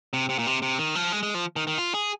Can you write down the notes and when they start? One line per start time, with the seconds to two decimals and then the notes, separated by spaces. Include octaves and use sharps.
0.13 C3
0.29 C3
0.39 A#2
0.47 C3
0.62 C3
0.79 D#3
0.95 F3
1.12 G#3
1.23 G#3
1.34 F3
1.56 D#3
1.67 D#3
1.78 F4
1.94 G#4